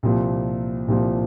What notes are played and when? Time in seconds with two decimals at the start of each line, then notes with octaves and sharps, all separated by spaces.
0.03 C2 A#2 F3
0.88 C2 A#2 F3